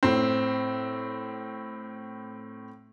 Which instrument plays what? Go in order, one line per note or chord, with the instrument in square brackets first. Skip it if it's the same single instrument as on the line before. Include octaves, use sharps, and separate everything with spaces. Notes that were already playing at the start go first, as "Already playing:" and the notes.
[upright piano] A2 C4